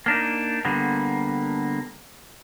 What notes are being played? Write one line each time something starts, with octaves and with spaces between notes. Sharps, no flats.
A#3 D4 D#4
D3 G3 A#3 B3